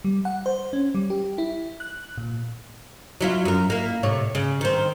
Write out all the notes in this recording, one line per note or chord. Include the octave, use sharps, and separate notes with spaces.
G3
F#5
C5
C#4
G3
G4
E4
F#6
A#2
F#3 E4 F4
F#2 A#4
A#3 E4
A2 C3 C#5
C#3
D#3 C4